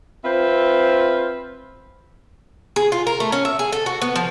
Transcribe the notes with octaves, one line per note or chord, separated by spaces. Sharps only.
C4 F4 B4 C5 E5
G#4
F4
A#4
A3
C#4
E5
G#4
A4
F#4
B3
F3